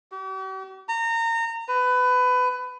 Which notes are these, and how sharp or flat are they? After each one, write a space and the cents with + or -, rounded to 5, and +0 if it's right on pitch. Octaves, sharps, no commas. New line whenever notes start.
G4 -45
A#5 -25
B4 +20